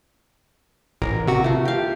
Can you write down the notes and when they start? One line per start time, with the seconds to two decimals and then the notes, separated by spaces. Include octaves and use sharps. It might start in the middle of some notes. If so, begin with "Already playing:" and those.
1.02 A1 A#4
1.27 C3 F#4
1.44 A3 F4
1.65 G4 F5